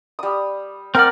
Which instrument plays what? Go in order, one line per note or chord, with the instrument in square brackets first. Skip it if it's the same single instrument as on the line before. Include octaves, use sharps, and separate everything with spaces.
[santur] G3 D#6
[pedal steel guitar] C4 D5 [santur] A#4 F#5 [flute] F6